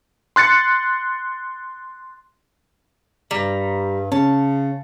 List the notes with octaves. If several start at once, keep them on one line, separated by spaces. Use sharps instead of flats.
C6 F#6 A6 C#7
G2 G3 A#5
C#3 C#4 A5